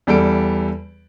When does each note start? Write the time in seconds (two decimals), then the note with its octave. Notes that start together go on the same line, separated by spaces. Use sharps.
0.07 E2 G3 A4 D7